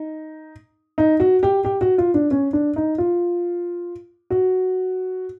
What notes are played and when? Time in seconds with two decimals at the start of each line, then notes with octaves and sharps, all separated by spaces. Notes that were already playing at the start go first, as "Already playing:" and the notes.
Already playing: D#4
0.98 D#4
1.20 F#4
1.43 G4
1.65 G4
1.81 F#4
1.98 F4
2.14 D4
2.31 C#4
2.53 D4
2.76 D#4
2.98 F4
4.30 F#4